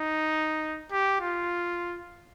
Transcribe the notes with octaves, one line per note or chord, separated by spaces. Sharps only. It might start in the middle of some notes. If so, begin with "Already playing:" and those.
Already playing: D#4
G4
F4